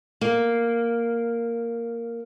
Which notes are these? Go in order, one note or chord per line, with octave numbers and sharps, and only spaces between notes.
A#3